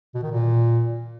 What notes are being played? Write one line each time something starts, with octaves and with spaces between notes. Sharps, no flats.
B2
D#3
A#2